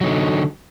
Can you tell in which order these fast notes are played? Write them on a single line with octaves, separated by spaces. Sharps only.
F#3 D#4 D3